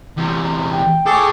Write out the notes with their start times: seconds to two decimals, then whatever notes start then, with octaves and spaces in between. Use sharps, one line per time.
0.17 E2 C3
0.72 G5
1.06 G#4 A4 C#5 D6